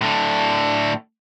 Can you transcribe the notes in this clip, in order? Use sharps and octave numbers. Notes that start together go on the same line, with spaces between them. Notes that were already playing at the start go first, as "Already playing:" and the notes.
A2 D3